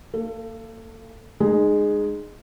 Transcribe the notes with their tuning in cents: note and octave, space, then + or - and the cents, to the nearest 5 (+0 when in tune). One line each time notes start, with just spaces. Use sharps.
A#3 -30 A4 +20
G#3 +0 D#4 -30